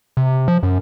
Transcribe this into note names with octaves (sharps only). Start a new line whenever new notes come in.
C3
F3
F#2